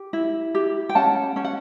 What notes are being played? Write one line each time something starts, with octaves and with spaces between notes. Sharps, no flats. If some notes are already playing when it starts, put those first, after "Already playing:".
Already playing: G4
E4
G4
G5
C#4 F#5 A5
C#4 G5
F#5